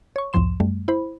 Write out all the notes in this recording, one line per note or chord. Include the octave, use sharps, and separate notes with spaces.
C#5 C#6
B1 E2 G#2 F3 C6 E7
F#2 G3 A3
E4 C5 B5